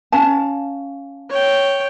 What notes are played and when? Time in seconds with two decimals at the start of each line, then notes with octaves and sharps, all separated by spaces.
0.12 C#4 F5 A5
1.30 C#5 G5